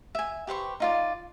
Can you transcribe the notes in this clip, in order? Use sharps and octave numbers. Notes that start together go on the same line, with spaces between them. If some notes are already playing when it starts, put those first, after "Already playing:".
E5 G#5
G4 B4 C5 C#6
D#4 F4 D5